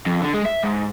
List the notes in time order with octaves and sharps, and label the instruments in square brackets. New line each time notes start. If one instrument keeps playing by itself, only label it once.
[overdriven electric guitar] F2
D3
G#3
E5
G#2